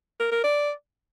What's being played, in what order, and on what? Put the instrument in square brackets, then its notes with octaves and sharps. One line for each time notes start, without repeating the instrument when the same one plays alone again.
[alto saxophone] A#4
A#4
D5